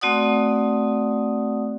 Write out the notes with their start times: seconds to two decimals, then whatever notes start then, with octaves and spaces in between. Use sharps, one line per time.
0.01 A3 C4 F#4 D5 F#5 D#6